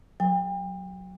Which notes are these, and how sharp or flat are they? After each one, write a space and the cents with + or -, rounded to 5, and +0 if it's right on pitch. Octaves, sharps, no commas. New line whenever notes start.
F#3 +0 G5 +35